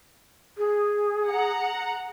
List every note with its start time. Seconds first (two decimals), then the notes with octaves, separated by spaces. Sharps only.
0.58 G#4
1.28 F#5 A#5